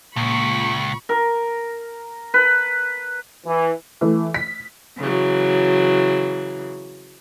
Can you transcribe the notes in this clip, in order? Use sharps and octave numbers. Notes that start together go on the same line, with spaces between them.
C#2 A#2 B5 C#6
A#4
B4
E3
E3 A3
B6
C#3 E3 F#3